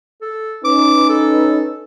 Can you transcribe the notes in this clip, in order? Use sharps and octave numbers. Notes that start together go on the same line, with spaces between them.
A4
C#4 D#4 B4 D6
A4